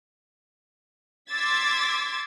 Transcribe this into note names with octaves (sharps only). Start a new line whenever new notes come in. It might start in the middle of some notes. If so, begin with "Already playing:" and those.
C6 D6 E6 G#6 A6 B6